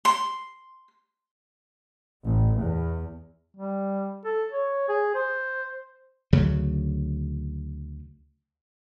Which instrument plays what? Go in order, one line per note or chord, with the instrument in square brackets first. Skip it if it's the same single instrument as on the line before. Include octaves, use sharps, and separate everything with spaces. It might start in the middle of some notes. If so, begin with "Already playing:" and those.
[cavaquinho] C6
[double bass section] A1
E2
[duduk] G3
A4
C#5
G#4
C5
[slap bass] D2 C#3 F#3